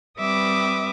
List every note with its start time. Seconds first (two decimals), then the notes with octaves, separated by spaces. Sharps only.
0.19 G3 C4 B4 E5 D6 D#6